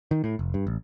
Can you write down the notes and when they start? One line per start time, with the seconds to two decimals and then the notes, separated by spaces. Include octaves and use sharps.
0.11 D#3
0.24 A2
0.39 F1
0.54 G2
0.67 A1